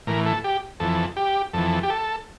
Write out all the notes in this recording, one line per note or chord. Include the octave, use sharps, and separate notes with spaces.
A2 E3 A#4
A4
G4
F2 E3 A4
G4
F2 E3 A4
G4
A4